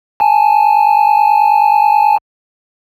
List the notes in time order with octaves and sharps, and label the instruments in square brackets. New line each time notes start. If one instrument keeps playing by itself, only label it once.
[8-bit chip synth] G#5 A5